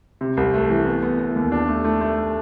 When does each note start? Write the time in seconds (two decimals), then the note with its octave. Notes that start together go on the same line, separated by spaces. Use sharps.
0.21 C3
0.37 C2
0.54 A3
0.70 E3
0.86 B3
1.03 B3
1.19 B3
1.35 D#2
1.52 D4
1.68 A3
1.84 A3
2.01 A3